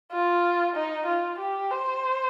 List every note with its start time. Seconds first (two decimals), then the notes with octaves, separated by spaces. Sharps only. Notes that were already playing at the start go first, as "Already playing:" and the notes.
0.12 F4
0.75 D#4
1.06 F4
1.39 G4
1.71 C5